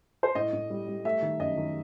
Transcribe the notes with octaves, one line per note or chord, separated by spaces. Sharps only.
C5
A2 D#5
A2
G3
G3
A3 E5
D#3
F#2 D#5
D#3